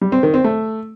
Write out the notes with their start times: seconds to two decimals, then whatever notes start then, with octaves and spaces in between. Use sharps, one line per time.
0.01 G3
0.12 C4
0.23 D#3
0.34 C4
0.44 A3